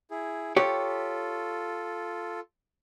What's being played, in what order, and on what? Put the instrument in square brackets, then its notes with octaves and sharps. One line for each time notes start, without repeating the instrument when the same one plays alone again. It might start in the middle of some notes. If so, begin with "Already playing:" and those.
[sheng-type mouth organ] E4 G#4
[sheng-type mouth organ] F4 A4 [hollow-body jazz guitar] G4 C#5